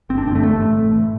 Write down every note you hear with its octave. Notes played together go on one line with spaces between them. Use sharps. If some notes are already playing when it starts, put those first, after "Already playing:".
G1 C4
D4
G2 C4
D3 A3
A1 A3
A2
A1
A2